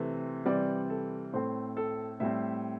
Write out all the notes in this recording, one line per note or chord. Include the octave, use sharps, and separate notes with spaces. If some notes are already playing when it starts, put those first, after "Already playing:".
Already playing: C3 E3 A3 C4
C3 E3 G3 C4 D5
A4
A2 A3 C4 C5
A4
A2 G3 C4 E5